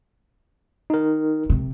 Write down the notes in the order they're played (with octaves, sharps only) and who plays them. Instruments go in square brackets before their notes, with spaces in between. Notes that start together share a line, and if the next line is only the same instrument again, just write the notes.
[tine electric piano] D#4 A#4
[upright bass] C3